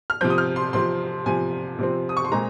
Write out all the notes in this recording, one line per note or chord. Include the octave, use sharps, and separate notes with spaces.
F6
C3 F3 C4 G6
D#6
F6
C6
C3 F3 C4 C6
C3 F3 C4 G#5
C3 F3 C4
D#6
C#6
C6
A#2 G#3 C4 A#5